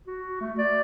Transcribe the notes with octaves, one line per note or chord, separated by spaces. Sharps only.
F#4
A3
D5